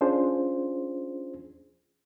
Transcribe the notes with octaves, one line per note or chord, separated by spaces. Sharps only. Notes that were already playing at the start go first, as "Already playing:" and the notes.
C#4 D4 F4 G#4 C5